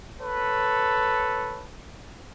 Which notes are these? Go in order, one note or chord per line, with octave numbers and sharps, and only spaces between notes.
A4 B4 C#5